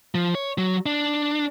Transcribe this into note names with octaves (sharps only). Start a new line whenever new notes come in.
F3
C#5
F#3
D4